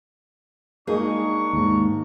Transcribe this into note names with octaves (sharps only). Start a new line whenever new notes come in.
G#3 A#3 D4 D#4 G#4 A#5 C#6
D#2 G#2